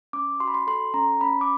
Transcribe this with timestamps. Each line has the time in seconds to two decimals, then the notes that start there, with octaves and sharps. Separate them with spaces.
0.13 C#4 D6
0.40 F#4 C6
0.48 B5
0.54 C6
0.67 A4 C6
0.94 C#4 A#5
1.21 C#4 B5
1.41 D6